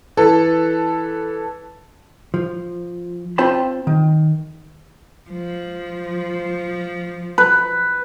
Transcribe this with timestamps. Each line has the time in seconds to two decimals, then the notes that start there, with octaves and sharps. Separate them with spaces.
0.17 E3 A4 B4
2.34 F3
3.38 C4 F4 C5 G5 A5 B5
3.87 D#3
5.30 F3
7.38 B4